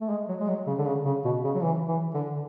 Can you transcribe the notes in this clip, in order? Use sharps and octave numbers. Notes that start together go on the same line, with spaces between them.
A3
G#3
F#3
G#3
F#3
C#3
D3
C#3
C#3
B2
C#3
F#3
E3
E3
D3